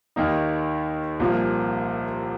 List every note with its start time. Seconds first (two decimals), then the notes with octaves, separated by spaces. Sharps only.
0.16 D#2 D#3 A#3 D#4
1.20 C2 A#2 F3 A#3